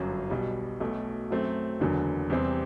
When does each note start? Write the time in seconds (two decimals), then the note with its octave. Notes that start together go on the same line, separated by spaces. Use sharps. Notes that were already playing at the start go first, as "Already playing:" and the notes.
Already playing: G1 F#2 F#3
0.30 B1 B2 G3
0.80 B1 B2 A3
1.31 F#2 F#3 A3 C4
1.80 F#1 E2 D3 F#3
2.30 E2 C3 G3 C4